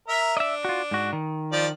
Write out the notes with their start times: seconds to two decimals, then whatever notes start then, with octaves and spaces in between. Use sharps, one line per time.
0.08 A#4 E5
0.37 D4 D#5 E5
0.65 F4 F#4
0.91 G#2 F#4
1.13 D#3
1.52 F3 D5